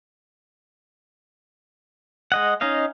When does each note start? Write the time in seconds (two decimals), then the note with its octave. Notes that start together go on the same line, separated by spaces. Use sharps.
2.32 G#3 D#5 F#5
2.61 C#4 D#4 D#5 F5